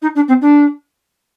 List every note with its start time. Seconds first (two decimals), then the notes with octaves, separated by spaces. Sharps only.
0.02 D#4
0.15 D4
0.28 C4
0.41 D4